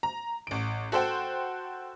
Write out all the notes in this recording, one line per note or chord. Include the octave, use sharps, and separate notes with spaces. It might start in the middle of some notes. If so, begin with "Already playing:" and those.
A#5
A1 D7
F#4 A4 C5 F#5 G5